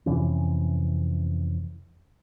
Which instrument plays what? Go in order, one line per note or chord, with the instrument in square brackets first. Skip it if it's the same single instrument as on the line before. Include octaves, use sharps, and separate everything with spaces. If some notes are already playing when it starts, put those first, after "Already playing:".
[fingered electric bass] F2 C3 E3 C#4